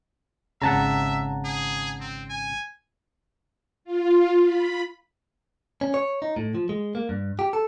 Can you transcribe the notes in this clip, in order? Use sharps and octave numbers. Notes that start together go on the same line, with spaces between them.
G#1 C#3 E5 F#5 A5 A#5
G#4
C4
G#5
F4
B5
C#4
C#5
D#4
A2
F3
G#3
A#3
G2
G4
A4